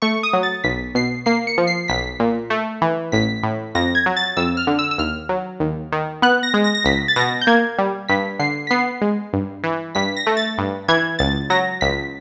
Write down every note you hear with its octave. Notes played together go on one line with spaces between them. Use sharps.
A3 C#6
D#6
F#3
A6
B1 B6
B2 C7
A#3 C7
C#7
F3
C7
B1 B6
A#2
A3
E3
A1 B6
A2
F2 A#6
G#6
F#3
A6
F2 E6
F6
D3
E6
E6
D#2 F6
F#3
D#2
D#3
B3 F#6
A#6
G#3
A#6
A#6
C#2 B6
A6
B2 A#6
G6
A#3 G#6
G3
G2 B6
D3 C7
B6
B3 C7
G#3
G2
E3
G2 B6
A#6
A3
A6
G2
E3 G#6
C#2 A6
F#3 A#6
C#2 B6